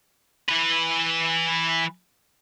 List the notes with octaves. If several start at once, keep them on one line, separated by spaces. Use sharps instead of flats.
E3 B4